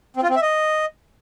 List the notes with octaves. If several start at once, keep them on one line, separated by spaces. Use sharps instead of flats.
C4
F4
C4
E5
D#5